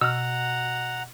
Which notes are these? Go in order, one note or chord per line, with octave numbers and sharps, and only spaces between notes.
B2 F#5 A#5 E6 F6